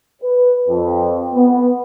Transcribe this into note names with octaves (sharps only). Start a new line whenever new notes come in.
B4
F2
B3